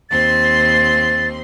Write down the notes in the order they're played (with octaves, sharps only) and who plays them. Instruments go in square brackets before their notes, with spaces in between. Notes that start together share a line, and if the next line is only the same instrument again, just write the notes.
[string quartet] D#2 C4 C6 [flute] A6